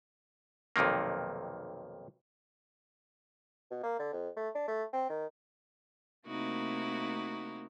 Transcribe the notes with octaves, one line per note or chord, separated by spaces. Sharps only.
B1 F2 C3 D#3 A#3
B2
A#3
D3
F2
A3
D4
A3
C4
D#3
C3 A3 A#3 D#4 E4 F#4